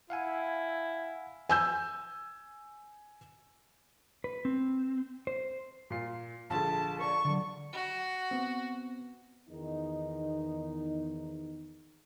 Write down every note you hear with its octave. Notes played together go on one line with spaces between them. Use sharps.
E4 F5 F#5 G#5
G#5 E6 G6
B4
C4
C5
A#2 F4 C7
A#1 D3 G#4 A5
A#4 C#5 D5 C#6
D3 F#3 D5
F#4
B3 C4
E2 D#3 D#4